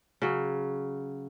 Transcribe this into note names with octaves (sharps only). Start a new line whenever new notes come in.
C#3 F#3